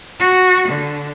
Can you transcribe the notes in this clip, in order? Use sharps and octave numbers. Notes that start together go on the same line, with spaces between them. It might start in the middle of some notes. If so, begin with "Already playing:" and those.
F#4
D3